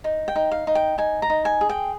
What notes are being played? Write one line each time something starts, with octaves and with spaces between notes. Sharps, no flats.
D#4
G5
D#4
F5
D#4
G5
D#4 G#5
A#5
D#4
G#5
G#4
G5